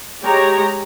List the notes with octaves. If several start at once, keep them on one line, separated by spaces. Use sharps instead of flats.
G#3 G4 C#5 A#5